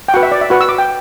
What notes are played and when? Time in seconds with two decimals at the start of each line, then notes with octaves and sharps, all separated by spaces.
0.08 G5
0.14 F#4 B4 F#5
0.23 E5
0.32 D5
0.41 E5
0.50 F#4 B4 F#5
0.61 E6
0.69 D6
0.78 G5